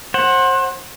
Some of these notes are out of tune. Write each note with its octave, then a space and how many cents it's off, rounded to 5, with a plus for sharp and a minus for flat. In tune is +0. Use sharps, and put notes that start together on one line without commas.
C5 +30 F#5 +0